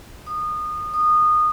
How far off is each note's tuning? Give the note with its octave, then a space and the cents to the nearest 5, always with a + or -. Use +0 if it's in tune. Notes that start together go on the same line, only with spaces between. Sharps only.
D#6 -25
D#6 -20